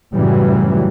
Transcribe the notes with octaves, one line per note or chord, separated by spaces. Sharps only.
F#2 A2 C#3 E3 F#3 G3